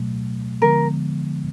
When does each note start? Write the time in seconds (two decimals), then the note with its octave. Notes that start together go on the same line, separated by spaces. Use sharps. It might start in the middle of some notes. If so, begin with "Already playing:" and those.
Already playing: B2 F#3 A3
0.61 D3 F3 G#3 B3 A#4